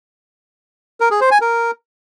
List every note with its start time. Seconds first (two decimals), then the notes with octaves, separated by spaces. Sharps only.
1.00 A#4
1.11 G#4
1.21 C5
1.31 G#5
1.41 A#4